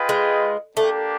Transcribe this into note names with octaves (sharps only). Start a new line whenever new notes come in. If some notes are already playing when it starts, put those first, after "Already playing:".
Already playing: F4 G#4 B4 D#5 G5
G#3
A3 A#3 D4 G4